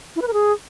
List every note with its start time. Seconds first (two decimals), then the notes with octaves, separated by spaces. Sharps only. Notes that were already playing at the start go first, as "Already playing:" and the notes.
0.16 E4
0.22 B4
0.27 A#4
0.33 G#4